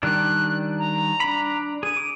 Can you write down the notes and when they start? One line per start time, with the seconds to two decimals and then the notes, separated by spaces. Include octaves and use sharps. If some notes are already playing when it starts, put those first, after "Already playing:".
0.03 D#3 G3 D4 F#6
0.78 A#5
1.20 D4 B5
1.83 G#4 D#7
1.97 D6